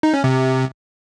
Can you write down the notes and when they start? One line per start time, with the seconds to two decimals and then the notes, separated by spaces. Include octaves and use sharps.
0.03 D#4
0.14 C#4
0.24 C3